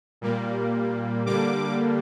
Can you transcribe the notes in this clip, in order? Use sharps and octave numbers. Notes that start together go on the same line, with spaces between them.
A#2 G3 A#3
D3 G3 A#3 D6